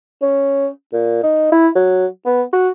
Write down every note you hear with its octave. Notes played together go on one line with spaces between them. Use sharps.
C#4
A#2
D#4
E4
F#3
B3
F#4